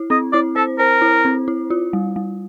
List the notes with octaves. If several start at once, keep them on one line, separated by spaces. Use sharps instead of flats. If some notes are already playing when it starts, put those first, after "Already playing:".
Already playing: E4
C4 D#5
E4 D5
A4 C5
A#4 C5
E4
C4
E4
F4
G3
G3